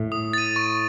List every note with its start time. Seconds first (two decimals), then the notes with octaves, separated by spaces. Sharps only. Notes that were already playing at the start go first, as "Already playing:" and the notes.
Already playing: A2
0.12 D#6
0.33 A6 D#7
0.56 C#6